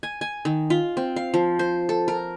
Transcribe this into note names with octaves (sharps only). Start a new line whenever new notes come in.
G#5
G#5
D#3
F4
C4
F5
F3
C5
A4
A#4